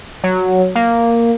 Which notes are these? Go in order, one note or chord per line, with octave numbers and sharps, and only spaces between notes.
F#3
A#3